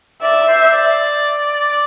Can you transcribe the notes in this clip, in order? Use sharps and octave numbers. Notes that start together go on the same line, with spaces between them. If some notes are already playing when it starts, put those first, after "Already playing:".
D5 E5
C5
D5
D5